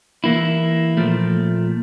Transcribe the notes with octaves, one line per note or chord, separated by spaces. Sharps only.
E3 A#3 E4
A#2 F3 A3